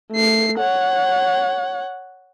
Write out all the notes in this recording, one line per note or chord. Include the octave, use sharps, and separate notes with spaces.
A3 C7
C#5 F#5